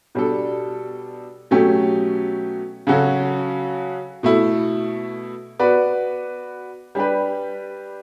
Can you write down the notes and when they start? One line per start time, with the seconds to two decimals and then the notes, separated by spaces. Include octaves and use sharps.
0.15 B2 G3 D4 A4
1.51 B2 F#3 A3 C#4 G4
2.87 C#3 F#3 C#4 F#4 A4
4.23 B2 A3 E4
5.59 B3 F#4 B4 D5
6.95 G3 D4 G4 B4